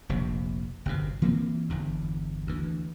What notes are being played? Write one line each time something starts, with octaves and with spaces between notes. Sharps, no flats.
F1 A#1 C3
G1 F#2 C3
E3 A#3 C4
G1 E2 G2
D2 E3